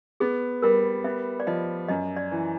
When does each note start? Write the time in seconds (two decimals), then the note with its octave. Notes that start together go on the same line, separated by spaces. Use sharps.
0.20 B3 G#4
0.62 G3 A#4
1.04 B3 E5
1.40 D5
1.47 F3 D#5
1.88 F#2 D#5
2.17 D5
2.32 E3